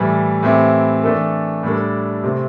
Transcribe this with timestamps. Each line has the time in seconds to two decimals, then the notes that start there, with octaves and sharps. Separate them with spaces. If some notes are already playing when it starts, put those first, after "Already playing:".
Already playing: A2 E3 G3
0.43 A2 E3 C4 E4 G4
1.03 E3 A3 D4 A4
1.63 A2 G3 D4 A4
2.23 C3 A3 C4